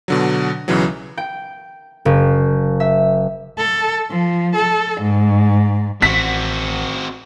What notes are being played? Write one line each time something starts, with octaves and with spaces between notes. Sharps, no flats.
B2 D3 F#3
B1 C#3 E3 F#3
G5
F#1
E5
A4
F3
A4
G#2
A1 C4 F#4 B6